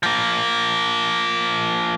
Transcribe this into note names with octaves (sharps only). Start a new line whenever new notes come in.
F3 A#3